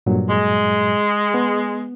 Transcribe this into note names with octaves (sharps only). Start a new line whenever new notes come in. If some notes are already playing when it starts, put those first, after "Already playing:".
G2 A#2 F#3
G#3
B3